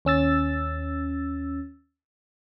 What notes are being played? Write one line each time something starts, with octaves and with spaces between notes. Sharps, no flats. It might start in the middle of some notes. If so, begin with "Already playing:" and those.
D#2 C#4 E6 A6